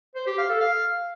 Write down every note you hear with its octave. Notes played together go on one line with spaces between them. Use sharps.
C5
G4
F5
A4
F5